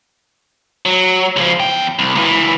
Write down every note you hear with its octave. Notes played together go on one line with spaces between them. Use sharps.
F#3
C#2 F3
E2 G5
C2
C#2 E3